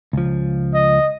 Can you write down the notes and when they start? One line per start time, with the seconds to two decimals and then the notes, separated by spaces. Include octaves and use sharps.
0.13 C#2 F3
0.74 D#5